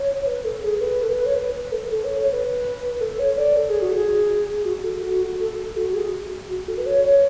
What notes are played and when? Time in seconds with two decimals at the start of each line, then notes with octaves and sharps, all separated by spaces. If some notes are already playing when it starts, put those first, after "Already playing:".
Already playing: C#5
0.27 B4
0.45 A4
0.63 G#4
0.81 B4
1.03 A4
1.09 B4
1.26 C#5
1.35 B4
1.54 B4
1.72 A4
1.86 B4
1.90 A4
2.04 C#5
2.18 C#5
2.33 B4
3.01 A4
3.19 C#5
3.37 D5
3.57 A4
3.69 G#4
3.82 F#4
3.95 G#4
4.65 F#4
4.84 A4
5.03 F#4
5.40 A4
5.58 A4
5.76 F#4
5.94 G#4
6.50 F#4
6.68 A4
6.78 B4
6.86 C#5
7.04 C#5